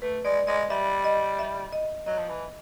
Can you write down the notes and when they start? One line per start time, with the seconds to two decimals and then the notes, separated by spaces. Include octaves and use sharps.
0.02 A3 B4
0.25 G#3 D5
0.47 G#3 D#5
0.70 G3 E5
1.04 D#5
1.39 E5
1.73 D#5
2.06 F#3 D#5
2.18 F3
2.29 E3